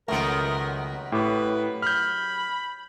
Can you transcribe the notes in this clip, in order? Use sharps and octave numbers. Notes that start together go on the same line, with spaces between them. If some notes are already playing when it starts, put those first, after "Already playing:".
C#2 F#2 D#3 A3 B3 A#4
A2 G4 B4
B5 F6 G6